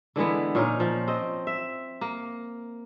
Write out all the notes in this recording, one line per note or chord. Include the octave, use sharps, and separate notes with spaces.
D3 E3 G#3 B3
A#2 C#4 D#4
F3
C4 D#5
E5
A#3